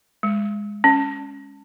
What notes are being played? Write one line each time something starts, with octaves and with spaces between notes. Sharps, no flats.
G#3
C#4